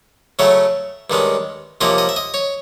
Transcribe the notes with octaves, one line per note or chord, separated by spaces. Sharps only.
C#3 F#3 A3 C#4 E5
G2 D#3 G#3 C#4
C3 F3 A#3 C#4 D#5
D#5
E5
D#5
C#5